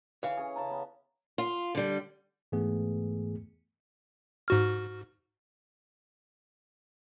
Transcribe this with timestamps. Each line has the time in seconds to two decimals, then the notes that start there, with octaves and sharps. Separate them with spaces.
0.23 E3 C#5 F5
0.37 C#4 G#4
0.56 C#3 A5 A#5
0.70 B3
1.38 F4
1.75 D3 G3
2.52 G#2 E3 A3 B3 G#4
4.48 G#2 F#4 F6